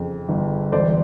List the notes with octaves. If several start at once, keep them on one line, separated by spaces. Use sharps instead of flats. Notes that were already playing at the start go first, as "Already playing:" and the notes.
Already playing: F2 C#3
G1
E1 C5 D5